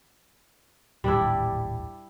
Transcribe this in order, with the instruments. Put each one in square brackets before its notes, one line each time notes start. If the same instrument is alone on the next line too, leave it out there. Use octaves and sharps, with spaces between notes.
[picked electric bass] D#1 A1 [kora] G3 D4 E4